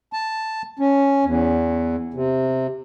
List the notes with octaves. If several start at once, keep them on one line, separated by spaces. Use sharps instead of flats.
A5
C#4
E2
C3